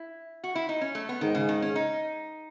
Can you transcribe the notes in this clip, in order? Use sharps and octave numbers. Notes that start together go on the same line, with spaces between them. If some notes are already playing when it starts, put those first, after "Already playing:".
Already playing: E4
F#4
E4
D#4
C#4
A3
B3
G#2 D#3
C#3
D#3
C#4
D#4